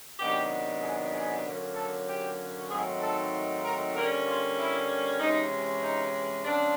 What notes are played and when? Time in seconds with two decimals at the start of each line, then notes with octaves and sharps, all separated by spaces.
0.18 C3 D#3 F#3 B3 D4 G4
0.82 G#4
1.13 G#4
1.44 D3 F#3 A#3 C#4
1.75 A4
2.07 G4
2.69 G#2 D#3 F#3 A3 C4 G#4
3.00 A4
3.63 A#4
3.94 D3 G3 A#3 C#4 A#4
4.26 F4
4.57 E4
5.19 C3 E3 G#3 C#4 D#4
5.81 D#4
6.43 C#3 F3 G#3 C4 D4